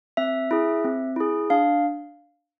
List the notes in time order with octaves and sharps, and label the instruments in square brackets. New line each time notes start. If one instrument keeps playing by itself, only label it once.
[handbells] C4 E5
E4 G#4
C4
E4 G#4
D4 F5